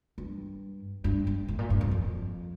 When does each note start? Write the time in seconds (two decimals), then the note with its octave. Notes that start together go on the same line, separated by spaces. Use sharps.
0.18 G2
1.04 G2
1.27 G2
1.48 A2
1.59 A#2
1.70 G2
1.81 F2
1.91 F2